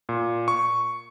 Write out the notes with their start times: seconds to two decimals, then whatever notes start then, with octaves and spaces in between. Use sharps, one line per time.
0.09 A#2
0.48 C#6